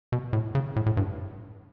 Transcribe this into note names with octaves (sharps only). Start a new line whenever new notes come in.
B2
A2
C#3
A2
A2
G2